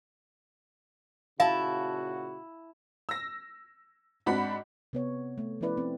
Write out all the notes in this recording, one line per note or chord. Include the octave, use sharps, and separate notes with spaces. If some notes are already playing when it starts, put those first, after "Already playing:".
A#2 C#3 E4 F#4 F5 A5
E6 A#6
G#2 C4 D4 F#4 F#5 B5
C3 B3 C#5
A3
F3 B3 C#4 E4 B4 D5
C4